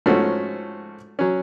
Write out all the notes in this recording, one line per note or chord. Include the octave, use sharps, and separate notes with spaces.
G#2 F3 A3 C#4 F#4
F#3 C#4